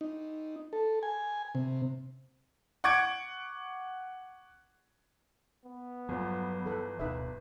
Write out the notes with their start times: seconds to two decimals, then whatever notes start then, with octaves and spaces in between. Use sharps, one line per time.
0.01 D#4
0.73 A4
1.03 G#5
1.55 C3
2.84 F#5 C#6 D6 G#6 C#7 D7
5.65 B3
6.09 G1 E2 F3 F#3
6.66 E3 A4 B4
6.99 D1 B2 D#4 B4 E5